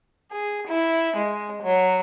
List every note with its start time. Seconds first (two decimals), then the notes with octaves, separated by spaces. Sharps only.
0.31 G#4
0.67 E4
1.16 G#3
1.61 F#3